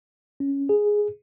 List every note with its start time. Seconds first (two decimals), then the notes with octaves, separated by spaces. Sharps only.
0.40 C#4
0.69 G#4